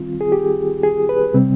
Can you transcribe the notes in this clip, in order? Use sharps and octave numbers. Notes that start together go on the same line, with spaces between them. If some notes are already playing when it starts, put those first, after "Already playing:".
Already playing: D#3 G3 C4 F4
G#4
G4
G#4
B4
C3 G3 C4